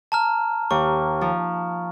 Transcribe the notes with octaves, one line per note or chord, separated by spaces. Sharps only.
A5 A#5 F6
D#2 C#6
F3